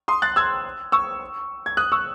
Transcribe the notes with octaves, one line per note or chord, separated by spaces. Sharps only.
C6 D#6
F#6 A6
E6 G#6
C#6 E6
G#6
D#6 F#6
C#6 E6